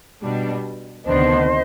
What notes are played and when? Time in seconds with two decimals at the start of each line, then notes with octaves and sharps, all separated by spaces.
0.23 B2 G3 D4
1.05 D2 C3 D#3 B3 D4 C5 D#5